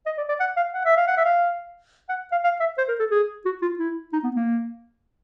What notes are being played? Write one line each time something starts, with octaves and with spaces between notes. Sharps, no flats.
D#5
D5
D5
F#5
F5
F#5
E5
F5
F#5
E5
F5
F#5
F5
F5
E5
C5
A#4
A4
G#4
F#4
F4
E4
D#4
B3
A#3